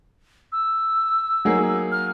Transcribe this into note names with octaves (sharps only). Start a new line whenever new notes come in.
E6
F#3 A#3 D#4 G#4
F6